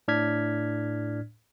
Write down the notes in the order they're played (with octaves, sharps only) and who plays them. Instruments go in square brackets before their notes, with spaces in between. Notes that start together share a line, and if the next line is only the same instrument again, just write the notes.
[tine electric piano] A2 D4 D5 F6 G#6 B6